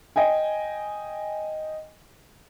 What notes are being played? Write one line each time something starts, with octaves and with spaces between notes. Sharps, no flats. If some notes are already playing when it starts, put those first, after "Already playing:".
D#5 G5 G#5